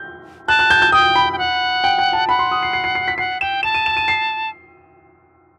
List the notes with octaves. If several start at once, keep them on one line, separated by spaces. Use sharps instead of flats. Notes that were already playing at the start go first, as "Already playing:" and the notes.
Already playing: G6
A5 F#6
F#6
G6
G6
G5 D#6
B5
G5
F#5
G5
G5
A5
F#5 B5
C6
D#6
C7
C7
C7
C7
B6
F#5 C7
G5 E7
A5 E7
D#7
E7
D#7
C7